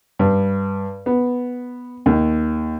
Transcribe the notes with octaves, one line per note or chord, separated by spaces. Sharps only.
G2
B3
D#2